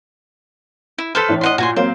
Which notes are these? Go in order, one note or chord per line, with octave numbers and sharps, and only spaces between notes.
E4
A4 B4 C5 F6 B6
A2 E3 D4
D#5 F#5 C6
A#2 F#4 G#5 C6
F#3 A#3 C4 C5